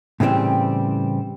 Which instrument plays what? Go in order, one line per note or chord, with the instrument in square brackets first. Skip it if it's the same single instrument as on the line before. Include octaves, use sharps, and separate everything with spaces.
[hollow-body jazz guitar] A2 C#3 E3 G3 C4